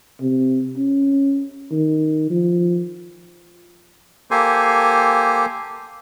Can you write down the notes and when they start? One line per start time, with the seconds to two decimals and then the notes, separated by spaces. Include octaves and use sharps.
0.21 C3
0.77 C#4
1.71 D#3
2.30 F3
4.31 A#3 G4 A4 C5 G#5